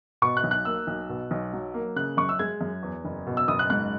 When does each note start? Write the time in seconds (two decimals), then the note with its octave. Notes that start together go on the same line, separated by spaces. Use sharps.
0.22 B2 C#6
0.37 F#6
0.44 B1
0.51 F#6
0.65 A#3 E6
0.87 B1
1.09 B2
1.31 B1
1.53 F#3
1.74 A#3
1.96 C#3 F#6
2.17 F#2 C#6
2.29 E6
2.39 G#3 G#6
2.61 F#2
2.83 E2
3.05 F#1
3.27 B2
3.37 E6
3.48 F#1 D#6
3.59 F#6
3.70 G#2 F#6